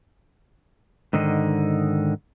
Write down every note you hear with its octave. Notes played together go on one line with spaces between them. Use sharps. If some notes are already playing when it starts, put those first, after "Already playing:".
G#2 D3 D#3 D#4